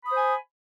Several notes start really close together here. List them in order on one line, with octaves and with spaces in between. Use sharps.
B5 D#6 C5 G#5